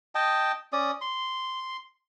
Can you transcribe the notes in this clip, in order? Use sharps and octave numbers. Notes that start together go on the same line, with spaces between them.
D#5 G5 A5
C#4 D5 D#6
C6